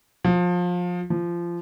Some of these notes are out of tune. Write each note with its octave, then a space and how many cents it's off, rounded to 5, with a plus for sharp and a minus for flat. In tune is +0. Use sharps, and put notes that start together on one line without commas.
F3 +25
F3 -20